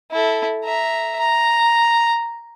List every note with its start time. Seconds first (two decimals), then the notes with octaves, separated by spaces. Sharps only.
0.12 E4 A4
0.65 E5 A#5
1.20 A#5